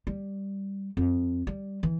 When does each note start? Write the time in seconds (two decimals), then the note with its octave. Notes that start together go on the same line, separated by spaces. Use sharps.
0.07 G3
0.97 F2
1.47 G3
1.83 E3